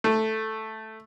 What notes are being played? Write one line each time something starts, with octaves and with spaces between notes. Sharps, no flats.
A3